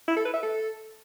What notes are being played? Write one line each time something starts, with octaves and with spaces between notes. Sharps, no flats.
E4
A4
B4
E5
A4